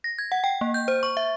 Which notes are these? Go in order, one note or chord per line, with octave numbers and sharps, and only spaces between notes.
A#6
G#6
F#5
G5
A#3
G6
C5
C#6
E5